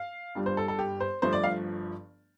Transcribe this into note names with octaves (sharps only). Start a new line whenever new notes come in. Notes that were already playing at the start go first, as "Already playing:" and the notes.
Already playing: F5
G1 G2 G3 D4 F4
C5
A4
A4
G4
C5
G1 G2 F3 A3 C5
D5
F5